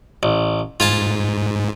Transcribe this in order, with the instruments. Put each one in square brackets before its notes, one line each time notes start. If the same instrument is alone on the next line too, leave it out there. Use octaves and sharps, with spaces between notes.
[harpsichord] A1
[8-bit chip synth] G#2 [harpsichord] F4 G#5 A5